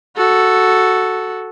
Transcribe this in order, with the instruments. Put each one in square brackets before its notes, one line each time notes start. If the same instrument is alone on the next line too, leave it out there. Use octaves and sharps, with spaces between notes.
[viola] F#4 A4